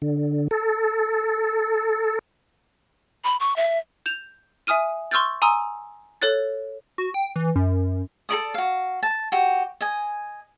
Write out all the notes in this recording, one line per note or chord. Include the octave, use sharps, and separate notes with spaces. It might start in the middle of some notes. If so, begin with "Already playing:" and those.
D3
A4
B5
C#6
E5
G6 E7 F7
E5 G#5 D#6 F6 D#7
C6 C#6 E6 F6 G6 A6
G#5 A#5 C6 D#6 E6
A4 C#5 F#6 A6
F#4
G5
E3
F#2
A4 A#4 D5 D#6
F#4 F5
A5
F#4 G4
D#5 G#5